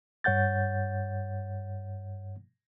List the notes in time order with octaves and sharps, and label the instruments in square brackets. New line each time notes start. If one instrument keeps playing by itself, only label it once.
[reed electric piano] G2 C#5 F#5 G6 A6